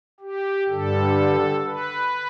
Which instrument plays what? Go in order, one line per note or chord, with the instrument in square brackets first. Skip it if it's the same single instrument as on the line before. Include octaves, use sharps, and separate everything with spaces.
[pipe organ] G4
G2 D3 G3 A4
B4